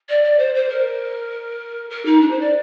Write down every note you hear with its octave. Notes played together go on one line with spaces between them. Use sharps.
D5
D5
C5
C5
A#4
A#4
D#4
D4
C5
D5